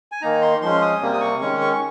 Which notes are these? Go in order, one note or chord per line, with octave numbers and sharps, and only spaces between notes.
G#5
D#3 A#3 D#4 A#5
C6
F3 G#3 C#4 C6
D#6
C3 G3 A#3
D#6
C#6
D#3 G#3 C#4 C#6
C#6
C#6